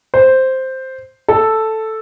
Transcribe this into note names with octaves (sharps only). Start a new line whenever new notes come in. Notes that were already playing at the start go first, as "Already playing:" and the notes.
C5
A4